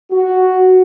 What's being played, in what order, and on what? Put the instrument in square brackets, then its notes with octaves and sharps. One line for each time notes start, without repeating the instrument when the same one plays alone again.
[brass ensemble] F#4